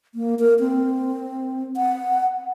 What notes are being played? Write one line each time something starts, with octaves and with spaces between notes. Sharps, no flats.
A#3
A#4
C4
F#5